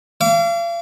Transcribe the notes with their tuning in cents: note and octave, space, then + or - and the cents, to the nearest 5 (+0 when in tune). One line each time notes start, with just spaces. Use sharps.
F5 -40 D6 -40